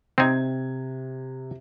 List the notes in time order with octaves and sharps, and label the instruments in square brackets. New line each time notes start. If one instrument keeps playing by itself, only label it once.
[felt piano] C3 G#6 [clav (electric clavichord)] C4 D#4